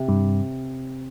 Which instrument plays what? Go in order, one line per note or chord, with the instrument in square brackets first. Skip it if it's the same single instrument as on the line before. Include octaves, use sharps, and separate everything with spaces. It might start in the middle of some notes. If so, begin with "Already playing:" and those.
Already playing: [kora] C3
[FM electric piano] G2